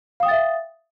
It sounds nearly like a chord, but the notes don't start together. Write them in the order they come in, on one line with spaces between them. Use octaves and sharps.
F5 D#6 G5 A6 E5